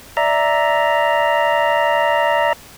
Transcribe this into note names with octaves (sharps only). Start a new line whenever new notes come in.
D5 E5 A#5